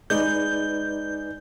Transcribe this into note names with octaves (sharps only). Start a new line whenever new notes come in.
G#3 D#4 B4 D5 G6